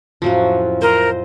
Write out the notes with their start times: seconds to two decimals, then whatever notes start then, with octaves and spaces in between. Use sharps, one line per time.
0.22 F2 A2 F3 F#3 C#4
0.82 A#4 C5 D#5